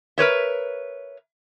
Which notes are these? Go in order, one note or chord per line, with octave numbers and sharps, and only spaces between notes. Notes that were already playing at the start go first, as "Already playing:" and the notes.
A#4 B4 C#5 E5